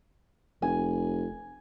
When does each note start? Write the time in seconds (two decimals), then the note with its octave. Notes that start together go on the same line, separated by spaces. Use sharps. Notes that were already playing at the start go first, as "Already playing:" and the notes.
0.62 F1 G#5